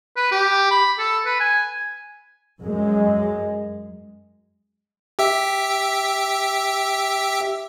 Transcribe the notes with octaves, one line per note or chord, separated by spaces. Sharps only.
B4
G4
B5
A4
B4
G#5
F#2 G#3
G4 E5